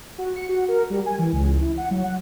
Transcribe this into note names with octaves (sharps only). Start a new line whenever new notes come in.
F#4
C#7
F#4
A#4
G3
G#5
E3
C#2
E4
F#5
F#3
F#5